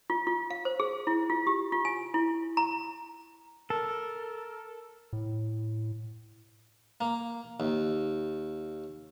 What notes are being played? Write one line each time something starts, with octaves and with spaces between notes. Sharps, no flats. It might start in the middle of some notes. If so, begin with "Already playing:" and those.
F4
F4
F5
C5
G#4
E4
F4
G4
F4
G#5
E4
A#5
A4 A#4
A2
A#3
D#2